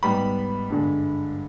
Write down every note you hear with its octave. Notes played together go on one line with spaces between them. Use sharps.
G#2 G3 B3 B5
G2 D3 G#3